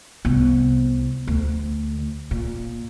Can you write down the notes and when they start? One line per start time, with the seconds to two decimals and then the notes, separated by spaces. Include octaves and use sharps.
0.25 C2 B3
1.27 D2
2.31 A#2